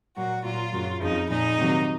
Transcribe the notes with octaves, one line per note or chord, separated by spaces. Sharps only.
A#2 F#3 A#3 F#4
A#2 F#3 A#3 F4
F#2 C#3 F#3 A#3
F2 C#3 F3 D#4
A#2 F3 G#3 D#4
C3 D#3 F#3 A#3